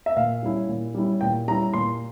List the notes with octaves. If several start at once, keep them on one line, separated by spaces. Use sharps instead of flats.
E5
A#2 F5
G3 C#4 E4
A#2
G3 C#4 E4
A#2 G5
G3 C#4 E4 A#5
A#2 C6